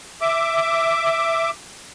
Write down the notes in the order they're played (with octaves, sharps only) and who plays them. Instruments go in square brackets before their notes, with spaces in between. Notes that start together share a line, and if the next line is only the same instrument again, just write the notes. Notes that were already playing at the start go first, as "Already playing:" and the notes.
[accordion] E5 D6